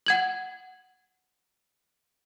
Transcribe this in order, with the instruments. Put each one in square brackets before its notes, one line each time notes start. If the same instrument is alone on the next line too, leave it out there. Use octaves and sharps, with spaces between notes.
[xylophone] F#5 G#6 F#7